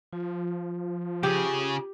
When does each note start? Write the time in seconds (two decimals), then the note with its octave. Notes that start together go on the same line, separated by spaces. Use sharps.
0.13 F3 F4
1.23 C#3 G4 G#4